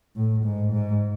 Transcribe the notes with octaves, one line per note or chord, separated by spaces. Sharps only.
A2
G#2
G#2